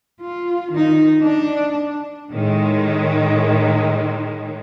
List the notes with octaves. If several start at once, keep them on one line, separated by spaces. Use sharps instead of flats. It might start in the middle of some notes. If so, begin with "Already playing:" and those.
F4
D#3 D#4
D4
A2 D#3 G#3